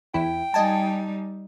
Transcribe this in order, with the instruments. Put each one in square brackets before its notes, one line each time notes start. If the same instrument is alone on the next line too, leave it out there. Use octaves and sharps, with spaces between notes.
[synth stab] E2 E4 [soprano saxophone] G5
[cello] G3 D#4 [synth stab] D#5 G#5 A5